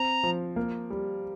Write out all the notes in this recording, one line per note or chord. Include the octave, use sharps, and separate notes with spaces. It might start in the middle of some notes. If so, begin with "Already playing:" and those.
Already playing: C4 A#5
F3
A#3
G3